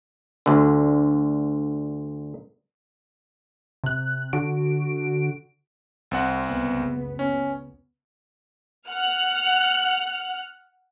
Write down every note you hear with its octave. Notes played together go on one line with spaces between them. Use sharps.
D2 D3
C3 F#6
D3 F#4 D7
C2 C4 F#5
F#1 C#2 B3
C#4
F#5 F6 F#6